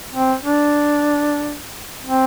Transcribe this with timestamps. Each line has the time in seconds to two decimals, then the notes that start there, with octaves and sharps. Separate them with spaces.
0.15 C4
0.43 D4
2.06 C4